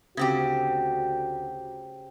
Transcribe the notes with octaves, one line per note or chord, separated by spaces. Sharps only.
D2 C#3 C4 F#4 G4